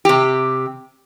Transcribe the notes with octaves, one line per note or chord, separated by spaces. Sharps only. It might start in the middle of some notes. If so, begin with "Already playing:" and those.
C3 G4